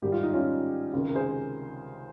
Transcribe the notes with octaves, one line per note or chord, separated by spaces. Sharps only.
G#2 D#3 G3 G4
F4
D#4
C#4 F4
C#2 C3 D#3
A#4
G#4 C5